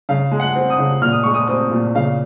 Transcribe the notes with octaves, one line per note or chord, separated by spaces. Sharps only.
C#3 F5
G#3
F#5
C4
D#6
C#3
A#2 F6
D#6
G#3 C#6
D#6
C4 D#6
A#2
C#3 F5